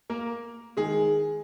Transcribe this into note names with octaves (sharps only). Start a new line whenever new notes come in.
A#3 A#4
D#3 G#3 G#4